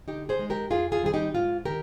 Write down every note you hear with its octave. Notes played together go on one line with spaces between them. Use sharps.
D3 D#4 G4
G#4 C5
G#3 D#4
G4 A#4
F2 F4 G#4
F4 G#4
D#3 G3 C4 G#4
D#4 G4
G#2 F4
D#3 G4 A#4